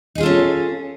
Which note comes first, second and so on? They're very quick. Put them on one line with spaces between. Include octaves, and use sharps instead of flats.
D#4 G#4 F4 A4 C#4